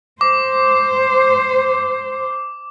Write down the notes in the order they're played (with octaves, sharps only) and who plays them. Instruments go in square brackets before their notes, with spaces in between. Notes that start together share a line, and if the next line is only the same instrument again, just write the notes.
[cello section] C5 [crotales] D6